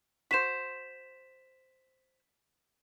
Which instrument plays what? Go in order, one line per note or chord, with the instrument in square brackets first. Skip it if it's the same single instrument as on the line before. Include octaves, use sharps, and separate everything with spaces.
[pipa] F#4 C5 [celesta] B6 E7